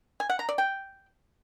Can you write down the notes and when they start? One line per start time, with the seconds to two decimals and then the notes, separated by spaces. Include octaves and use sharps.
0.20 G#5
0.30 F#5
0.39 A#5
0.49 D5
0.58 G5